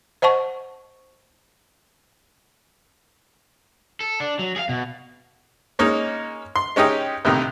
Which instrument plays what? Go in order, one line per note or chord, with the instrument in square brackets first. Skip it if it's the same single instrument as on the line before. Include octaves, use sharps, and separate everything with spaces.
[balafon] C5 D#5 F#5 A5 C#6
[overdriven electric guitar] A4
D4
F#3
G#4 F5
B2
[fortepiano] G#3 A#3 C#4 D#4
C6
G#3 C#4 D#4 G4 D#5
A#1 A2 C3 D#3